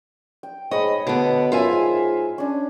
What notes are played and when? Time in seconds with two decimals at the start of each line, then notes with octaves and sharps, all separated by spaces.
0.43 G5
0.71 G#2 C#5 D#5 B5
1.07 B2 D3 B3
1.52 F#2 F4 E5 G#5
1.69 G#2
2.38 C#4 D4